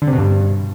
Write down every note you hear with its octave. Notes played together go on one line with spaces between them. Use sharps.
D3
C3
B2
G2